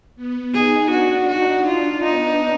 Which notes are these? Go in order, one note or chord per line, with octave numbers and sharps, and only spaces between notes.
B3
D#4 G#4
D4 F#4
D#4 F#4
D4 F4
B3 D#4